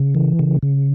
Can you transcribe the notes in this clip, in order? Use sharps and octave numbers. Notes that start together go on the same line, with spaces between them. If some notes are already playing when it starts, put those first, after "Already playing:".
Already playing: C#3
E3
C#3
C#3